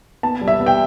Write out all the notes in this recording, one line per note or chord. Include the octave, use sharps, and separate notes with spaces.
B3 A5
G3
E5
B3
G5